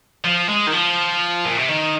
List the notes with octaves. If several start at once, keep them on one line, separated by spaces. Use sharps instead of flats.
F3
G#3
D#3
F3
A#2
C3
D#3